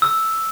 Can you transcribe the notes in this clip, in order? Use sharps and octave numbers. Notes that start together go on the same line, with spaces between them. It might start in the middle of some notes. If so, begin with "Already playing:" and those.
E6